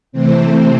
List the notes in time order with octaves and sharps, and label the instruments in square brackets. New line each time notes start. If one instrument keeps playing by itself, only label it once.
[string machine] C3 E3 A3 C4 C5